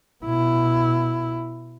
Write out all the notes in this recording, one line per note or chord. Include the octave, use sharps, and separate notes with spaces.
B2 E4